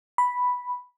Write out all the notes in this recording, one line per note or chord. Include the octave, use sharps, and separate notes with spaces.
B5